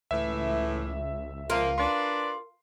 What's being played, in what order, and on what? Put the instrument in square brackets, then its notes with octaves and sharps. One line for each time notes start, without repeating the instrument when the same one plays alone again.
[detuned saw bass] C#2 [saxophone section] A2 E3 [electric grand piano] E5
[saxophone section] F3 A#3 [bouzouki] F4 A#4
[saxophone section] D4 B4 D5 [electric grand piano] C6